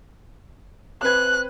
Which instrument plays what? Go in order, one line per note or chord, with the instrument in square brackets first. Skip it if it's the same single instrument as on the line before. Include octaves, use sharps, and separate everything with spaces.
[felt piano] C4 B4 G#6 [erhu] F#6